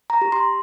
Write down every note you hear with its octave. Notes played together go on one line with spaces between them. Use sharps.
A#5
G4
C6